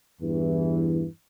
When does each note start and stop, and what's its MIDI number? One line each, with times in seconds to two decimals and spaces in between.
0.22 1.06 40
0.22 1.06 43
0.22 1.06 52